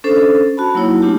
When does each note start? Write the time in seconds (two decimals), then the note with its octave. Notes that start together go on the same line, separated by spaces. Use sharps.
0.04 C#4 D4 A4 C5
0.57 F#4 A5 B5
0.74 F#3 A#3 D#4 E4 C#5
1.02 A3 C4 D4 D#4 F4 G4